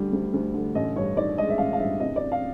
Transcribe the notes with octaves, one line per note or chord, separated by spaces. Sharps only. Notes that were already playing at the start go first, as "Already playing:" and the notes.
Already playing: D2 D3 G3
D2
D2
D3
A1 D#5
G2 C#5
D#3 D5
G#3 D#5
E5
A1 F5
F5
G2 E5
C2 D#5
D5
C3
F5